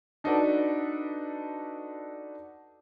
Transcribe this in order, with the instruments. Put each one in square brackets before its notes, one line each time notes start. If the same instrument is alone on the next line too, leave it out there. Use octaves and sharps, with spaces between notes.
[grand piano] D4 D#4 F#4 A4 B4 D5